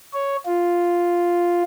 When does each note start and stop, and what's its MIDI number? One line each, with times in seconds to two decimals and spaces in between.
0.13 0.36 73
0.46 1.63 65